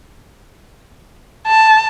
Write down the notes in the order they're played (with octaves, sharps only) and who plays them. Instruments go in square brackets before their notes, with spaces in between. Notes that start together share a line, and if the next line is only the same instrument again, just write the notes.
[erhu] A5